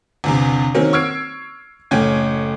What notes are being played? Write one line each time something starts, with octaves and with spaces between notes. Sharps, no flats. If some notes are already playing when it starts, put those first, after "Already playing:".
G1 E2 C3
D#3 F#3 A#3 C4 C#4
C#6 E6 F6 G#6 C7 D7
F#1 A2 C#4 G5 G#5 G#6